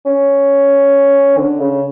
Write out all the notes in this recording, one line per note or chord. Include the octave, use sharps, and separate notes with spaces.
C#4
D3
C#3